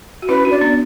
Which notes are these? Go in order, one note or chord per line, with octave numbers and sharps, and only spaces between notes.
F#4
C#4 E4 B4
D4 F#4
D5
B3 D4